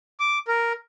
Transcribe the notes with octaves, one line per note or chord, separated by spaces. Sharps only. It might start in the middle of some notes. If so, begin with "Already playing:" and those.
D6
A#4